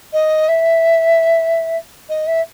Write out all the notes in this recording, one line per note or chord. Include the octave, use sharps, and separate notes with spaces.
D#5
E5
D#5
E5